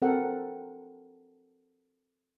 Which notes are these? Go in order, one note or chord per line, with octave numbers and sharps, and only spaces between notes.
C4 F#4 A4 A#4 F#5 G5